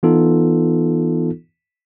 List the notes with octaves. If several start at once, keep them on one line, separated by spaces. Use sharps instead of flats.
E3 B3 D#4 F4 A4